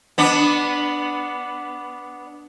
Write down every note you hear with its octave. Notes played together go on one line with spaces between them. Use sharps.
B3 D4